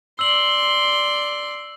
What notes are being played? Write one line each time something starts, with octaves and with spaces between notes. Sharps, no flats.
D5 C6 E6 F#7